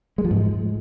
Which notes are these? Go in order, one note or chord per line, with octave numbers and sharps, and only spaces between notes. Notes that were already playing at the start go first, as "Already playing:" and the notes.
G#3
F3
G#2